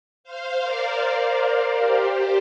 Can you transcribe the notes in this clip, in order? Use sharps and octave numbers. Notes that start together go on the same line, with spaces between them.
C5 F5
A#4 D5
G4 C5